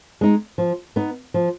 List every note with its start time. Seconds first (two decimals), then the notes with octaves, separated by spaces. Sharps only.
0.21 G#3 D#4
0.58 F3
0.96 B3 D#4
1.34 F3